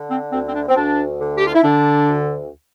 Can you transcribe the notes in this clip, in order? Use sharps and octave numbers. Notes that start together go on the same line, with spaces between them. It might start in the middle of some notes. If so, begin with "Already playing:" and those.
Already playing: D3
C4
D2 C4
C4
D4
C4
D2 D4
D3
G4
F4
E4
D3 D4
D2